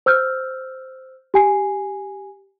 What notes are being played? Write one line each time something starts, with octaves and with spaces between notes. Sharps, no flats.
C5 E6 F6 G6
G4 G#5 C7